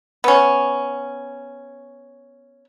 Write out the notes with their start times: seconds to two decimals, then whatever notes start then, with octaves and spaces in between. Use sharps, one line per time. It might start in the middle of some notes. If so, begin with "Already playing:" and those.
0.24 B3 C#4